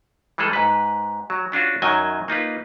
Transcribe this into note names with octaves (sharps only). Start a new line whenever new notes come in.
E3 G3 G#3 G#4 A4
G#2 B4
F#3
C#4 D4 F4 F#4
F#2 D#3 F#3 D#5 G#5
A#3 D#4 F4 B4